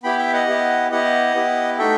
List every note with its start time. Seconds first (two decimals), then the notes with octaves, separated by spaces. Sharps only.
0.03 B3 E4 G4 G5 B5
0.18 E5 G5
0.33 D#5 F#5
0.48 B3 E4 G4
0.91 B3 E4 G4 D#5 F#5
1.34 B3 E4 G4
1.79 A3 D#4 F#4 A4 E5 G5